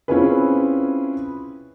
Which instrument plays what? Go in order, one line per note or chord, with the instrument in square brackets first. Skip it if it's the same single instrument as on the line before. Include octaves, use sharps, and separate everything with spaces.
[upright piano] C4 C#4 E4 F4 G#4 B4